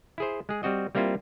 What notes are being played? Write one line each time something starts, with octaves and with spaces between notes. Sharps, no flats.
E4 G#4 C5
G#3 G#4
G3 C4 F#4 D#5
G3 A#3 C4 E4 F4